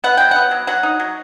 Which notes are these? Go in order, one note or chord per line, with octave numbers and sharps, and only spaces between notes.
B3 F#5
F#3 G5
B3 F#5
F#3
F#3 F#5
D#4
F#3